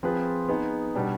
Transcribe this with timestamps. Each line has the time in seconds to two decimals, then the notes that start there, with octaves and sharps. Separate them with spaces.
0.03 F3 C4 F4 G#4 B4
0.49 B3 D#4 G#4
0.95 B2 G3 D4 G4